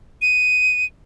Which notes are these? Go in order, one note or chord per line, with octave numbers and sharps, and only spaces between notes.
D#7